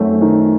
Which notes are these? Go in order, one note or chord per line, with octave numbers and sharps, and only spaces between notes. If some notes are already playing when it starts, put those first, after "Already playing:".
Already playing: F#2 D#3 A3 C4
D#3